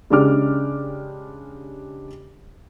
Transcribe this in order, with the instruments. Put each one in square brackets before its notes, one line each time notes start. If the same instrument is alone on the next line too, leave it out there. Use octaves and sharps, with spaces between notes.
[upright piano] C#3 G#3 D4 G4 D6 F6